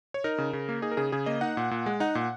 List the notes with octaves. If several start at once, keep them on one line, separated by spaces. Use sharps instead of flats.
C#5
D#4 A#4
C#3
C#3
A#3
D#4 G#4
A#4
C#3 G#4
C#3 G#4
A#3 D#5
D#4 F#5
A#2
A#2
G#3
D#4 F#5
A#2